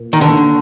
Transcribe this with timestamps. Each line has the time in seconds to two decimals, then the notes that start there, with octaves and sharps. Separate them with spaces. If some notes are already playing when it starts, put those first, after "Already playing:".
Already playing: A#2 A#3
0.13 D#3
0.21 D3